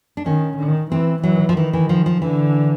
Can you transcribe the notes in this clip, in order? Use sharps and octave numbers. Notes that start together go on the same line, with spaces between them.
D4
D#3 C#4
D#3
E3 C4
E3 F#3
F3
D#3 E3
E3
F3
F3
D3 E3